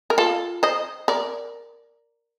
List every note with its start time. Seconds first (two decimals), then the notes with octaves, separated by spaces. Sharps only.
0.10 A#4
0.18 F4 A4
0.63 C5 D#5
1.08 A#4 D5